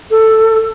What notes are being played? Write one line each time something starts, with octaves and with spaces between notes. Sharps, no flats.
A4